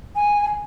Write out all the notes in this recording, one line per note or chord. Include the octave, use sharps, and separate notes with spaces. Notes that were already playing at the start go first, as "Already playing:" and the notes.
G#5